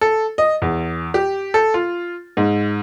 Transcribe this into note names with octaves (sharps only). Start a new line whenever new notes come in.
A4
D#5
E2
G4
A4
F4
G#2